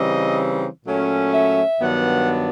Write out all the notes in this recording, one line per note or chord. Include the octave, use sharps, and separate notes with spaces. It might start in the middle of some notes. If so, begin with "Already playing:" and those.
Already playing: C#3 E3 G3 C4 D#4 D#5
A#2 F#3 A3 C#4
E5
G2 D#3 F#3 B3 D4 F#5